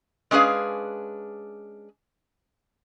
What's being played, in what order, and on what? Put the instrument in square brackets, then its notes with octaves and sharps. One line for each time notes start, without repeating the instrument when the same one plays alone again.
[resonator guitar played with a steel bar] G#3 C#4 D4 G#4 B4 F5